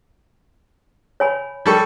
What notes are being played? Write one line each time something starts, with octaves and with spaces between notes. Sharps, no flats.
C#5 G#5 B5
G3 A4 C#6